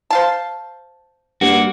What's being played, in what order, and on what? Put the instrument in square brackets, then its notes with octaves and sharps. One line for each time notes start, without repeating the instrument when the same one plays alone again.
[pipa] C5 F5 A5
[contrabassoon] G2 [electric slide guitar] A#3 F#4